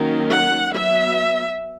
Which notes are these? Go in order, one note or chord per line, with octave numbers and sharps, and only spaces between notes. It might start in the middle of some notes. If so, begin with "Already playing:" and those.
Already playing: D#3 F#3 A#3 C#4
F#5
F#3 B3 E5